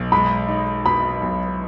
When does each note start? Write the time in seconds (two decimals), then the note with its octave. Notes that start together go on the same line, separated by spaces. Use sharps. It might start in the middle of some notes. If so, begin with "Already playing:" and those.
Already playing: B1 B2 D#4
0.12 G#3 B5
0.49 D#4
0.85 B2 B5
1.22 B1